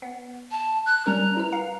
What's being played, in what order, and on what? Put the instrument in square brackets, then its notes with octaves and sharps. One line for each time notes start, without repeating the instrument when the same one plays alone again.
[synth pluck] B3
[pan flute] A5
F#6
[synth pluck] G3 C#4 A#4 [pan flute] A#5
[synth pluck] E4 B4
F5